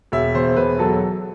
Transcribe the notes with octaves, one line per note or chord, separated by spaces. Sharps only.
E1 E5
E2 C5
E1 B4
F#3 A4